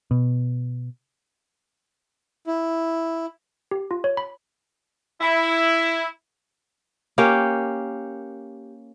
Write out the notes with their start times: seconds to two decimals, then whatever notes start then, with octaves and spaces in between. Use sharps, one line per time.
0.11 B2
2.47 E4
3.71 G4
3.91 F4
4.04 C#5
4.17 B5
5.21 E4
7.18 A#3 C#4 G4